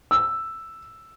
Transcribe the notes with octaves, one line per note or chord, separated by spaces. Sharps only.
E6